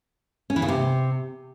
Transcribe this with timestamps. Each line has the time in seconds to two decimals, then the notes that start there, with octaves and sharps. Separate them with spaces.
0.50 C#4
0.56 E3
0.62 C#3
0.68 C3